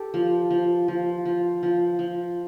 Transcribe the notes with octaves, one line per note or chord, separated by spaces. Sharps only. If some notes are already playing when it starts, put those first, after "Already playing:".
Already playing: G4 A4
F3
F3
F3
F3
F3
F3